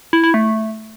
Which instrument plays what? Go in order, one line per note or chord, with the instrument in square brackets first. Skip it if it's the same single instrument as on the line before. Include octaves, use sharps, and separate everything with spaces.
[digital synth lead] E4
E4
A3